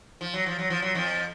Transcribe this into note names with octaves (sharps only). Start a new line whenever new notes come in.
F3
F#3
F3
F#3
F3
F#3
F2 F3